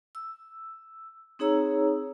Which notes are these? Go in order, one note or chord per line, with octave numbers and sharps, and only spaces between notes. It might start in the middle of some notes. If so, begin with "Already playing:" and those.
E6
C4 D#4 G#4 C#5 A#5 E6